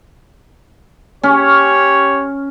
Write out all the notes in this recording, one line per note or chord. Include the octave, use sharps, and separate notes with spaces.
C#4 G4 C#5